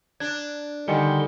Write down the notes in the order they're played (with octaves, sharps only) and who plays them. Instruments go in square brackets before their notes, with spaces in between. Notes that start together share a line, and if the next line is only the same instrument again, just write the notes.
[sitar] D4 [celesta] G#6
[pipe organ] D3 F#5 C6 [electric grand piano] D#3 G3 [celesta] D#5 G#5 C#7